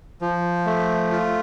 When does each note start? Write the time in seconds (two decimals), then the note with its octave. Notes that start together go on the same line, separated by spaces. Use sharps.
0.21 F3
0.66 A3
1.12 F4